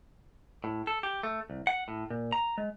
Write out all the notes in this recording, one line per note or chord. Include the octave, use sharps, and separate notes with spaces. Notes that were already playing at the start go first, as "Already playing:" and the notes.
A2
A4
G4
A3
C2
F#5
A2
A#2
A#5
G#3